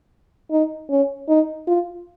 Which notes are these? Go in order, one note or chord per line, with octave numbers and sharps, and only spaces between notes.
D#4
C#4
D#4
F4